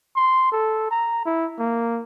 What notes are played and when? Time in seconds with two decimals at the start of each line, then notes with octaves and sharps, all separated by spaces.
0.16 C6
0.52 A4
0.91 A#5
1.25 E4
1.59 A#3